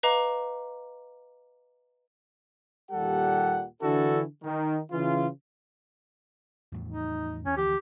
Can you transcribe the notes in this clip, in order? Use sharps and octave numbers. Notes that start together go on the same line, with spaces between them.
B4 D#5 F5 A#5 D6
D#2 A#2 G3 G4 A4 F#5
D3 E3 D4 E4 F#4 A4
D#3
C#3 E3 F4
E2 A2 F3
D#4
E2 C#4
D2 E3 F3 G4